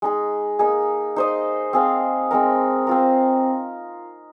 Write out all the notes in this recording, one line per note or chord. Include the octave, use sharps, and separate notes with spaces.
G#3 D#4 G#4
A#3 D#4 G#4
D#4 C5 D#5
C4 G#4 F5
G#3 C4 D#4 A#4
C4 F4 A#4